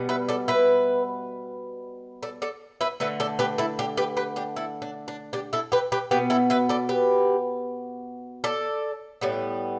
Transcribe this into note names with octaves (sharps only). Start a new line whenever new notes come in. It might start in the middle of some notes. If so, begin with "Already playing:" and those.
Already playing: B2 G3 B3
B4 E5
A4 D5
B4 E5
A4 D5
A4 D5
B4 E5
D3 A3 B4 E5
A4 D5
G4 B4
E4 A4
D4 G4
G4 B4
G4 B4
D4 G4
E4 A4
D4
D4
D4 G4
E4 A4
G4 B4
G4 B4
B2 B3 G4 B4
E4 A4
B4 E5
A4 D5
G4 B4
A4 D5
A2 G3 B3